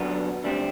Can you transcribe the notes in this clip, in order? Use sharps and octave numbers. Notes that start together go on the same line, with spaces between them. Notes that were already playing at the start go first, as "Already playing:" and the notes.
Already playing: F#2 D3 F#3 B3 D4
D2 D3 G3 C4